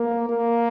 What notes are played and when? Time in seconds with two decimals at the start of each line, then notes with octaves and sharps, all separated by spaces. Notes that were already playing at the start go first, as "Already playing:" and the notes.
Already playing: A#3
0.29 A#3